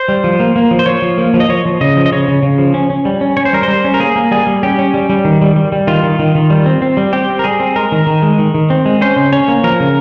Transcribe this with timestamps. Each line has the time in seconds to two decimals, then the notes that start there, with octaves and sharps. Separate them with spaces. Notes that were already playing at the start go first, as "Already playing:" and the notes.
Already playing: C5
0.08 G3
0.24 F3
0.40 A#3
0.56 A#3
0.71 F3
0.79 C5
0.86 F3 C#5
1.02 F3
1.18 A#3
1.34 F3
1.40 D#5
1.49 F3 C#5
1.65 F3
1.81 C#3 D#5
1.97 F3
2.06 D#5
2.12 C#3 C#5
2.28 C#3
2.43 C#3
2.58 F3
2.74 C#4
2.90 C#4
3.05 G3
3.21 C#4
3.37 C#4 C#5
3.45 C5
3.53 G3 A#4
3.63 G3 C5
3.84 C#4
3.94 A#4
4.00 A#3 G#4
4.16 A#3
4.31 G3 G#4
4.47 G3
4.63 C#4 G4
4.79 C#4
4.94 G3
5.10 G3
5.25 D#3
5.42 G3
5.56 G3
5.72 G3
5.87 D#3 F4
6.03 D#3
6.19 D#3
6.35 D#3
6.50 G3
6.66 C4
6.82 C4
6.97 G3
7.13 C4 G4
7.29 C4
7.39 A#4
7.44 G3 G#4
7.60 C4
7.76 G#3 A#4
7.92 D#3
8.07 D#3
8.22 G#3
8.39 D#3
8.54 D#3
8.70 C4
8.85 G#3
9.01 C#4 C5
9.16 C#3
9.32 C#4 C#5
9.48 A#3
9.63 F3 A#4
9.80 C#3